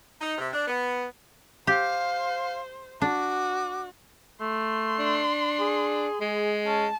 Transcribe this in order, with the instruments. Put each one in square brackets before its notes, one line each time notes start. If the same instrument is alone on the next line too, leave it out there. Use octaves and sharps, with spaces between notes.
[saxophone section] D#4
C3
D4
B3
[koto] G4 [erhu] C5 [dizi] F5
[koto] D4 [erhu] F#4 [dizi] D6
[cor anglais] A3 [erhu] C6
[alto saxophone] D4
[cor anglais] G#4
[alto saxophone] G#3 [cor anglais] G#4
[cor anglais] C#4 [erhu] A5